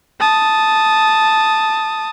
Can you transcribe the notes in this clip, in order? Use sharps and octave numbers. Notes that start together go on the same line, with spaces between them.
A5 D#6